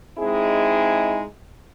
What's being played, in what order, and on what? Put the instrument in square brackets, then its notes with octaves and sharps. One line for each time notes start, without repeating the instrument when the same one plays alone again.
[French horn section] G#3 C4 D#4 E4 G#4